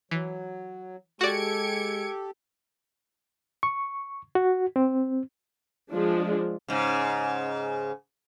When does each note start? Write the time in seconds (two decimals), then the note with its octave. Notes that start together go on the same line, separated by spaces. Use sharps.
0.11 E3 F#3
1.21 G#3 F#4 G4 A4 D5 G#6 C#7 D7
3.63 C#6
4.35 F#4
4.76 C4
5.92 F3 G#3 D4
6.68 G#2 C#3